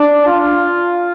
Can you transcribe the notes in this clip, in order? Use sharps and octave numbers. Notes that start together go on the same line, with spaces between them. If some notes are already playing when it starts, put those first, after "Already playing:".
Already playing: D4
F4